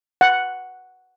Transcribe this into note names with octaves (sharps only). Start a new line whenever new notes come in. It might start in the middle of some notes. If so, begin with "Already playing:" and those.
F#5